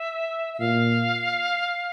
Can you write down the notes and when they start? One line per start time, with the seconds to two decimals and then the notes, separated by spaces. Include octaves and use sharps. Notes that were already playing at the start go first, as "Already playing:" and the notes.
Already playing: E5
0.54 E5
0.59 A#2 F5